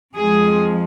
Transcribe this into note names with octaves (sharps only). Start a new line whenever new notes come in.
F2 F3 G#3 G#4